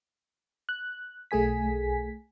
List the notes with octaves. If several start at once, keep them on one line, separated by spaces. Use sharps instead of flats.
F#6
B1 A3 G#4 G#5 B6